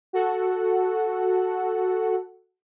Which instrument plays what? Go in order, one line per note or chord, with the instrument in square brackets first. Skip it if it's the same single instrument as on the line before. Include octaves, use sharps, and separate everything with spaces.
[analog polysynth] F#4 A4 F#5